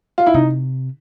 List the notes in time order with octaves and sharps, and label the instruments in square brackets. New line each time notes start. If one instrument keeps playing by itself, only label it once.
[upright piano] F4
E4
[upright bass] C3 [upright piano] D#4